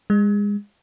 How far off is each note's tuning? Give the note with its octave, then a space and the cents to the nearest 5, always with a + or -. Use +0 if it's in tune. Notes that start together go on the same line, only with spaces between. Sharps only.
G#3 -25